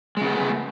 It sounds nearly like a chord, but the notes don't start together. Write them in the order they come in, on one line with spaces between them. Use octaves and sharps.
G#3 C#3 B3 A3